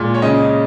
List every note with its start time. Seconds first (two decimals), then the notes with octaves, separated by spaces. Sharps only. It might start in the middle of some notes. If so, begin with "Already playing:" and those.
Already playing: A#2 G#3
0.14 C#5
0.22 C#3 D#5